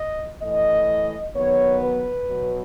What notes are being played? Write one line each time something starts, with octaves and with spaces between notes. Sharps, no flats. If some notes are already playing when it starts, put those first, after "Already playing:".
Already playing: D#5
A2 E3 A3 D#5
D#3 F#3 B3 C#5
B4
B2 F#3 B3